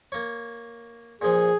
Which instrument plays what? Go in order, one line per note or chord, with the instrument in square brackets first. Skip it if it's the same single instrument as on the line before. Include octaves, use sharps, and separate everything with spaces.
[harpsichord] A#3 C#5
[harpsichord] A#2 F3 [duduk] G#4